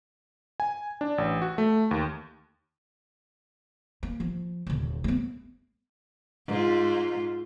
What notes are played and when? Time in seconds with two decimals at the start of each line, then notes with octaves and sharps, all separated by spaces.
0.60 G#5
1.01 D4
1.18 A1
1.42 F#4
1.58 A3
1.91 D#2
4.03 A#3
4.20 F3
4.67 D#1 D3
5.04 A3 B3
6.47 G#2 F4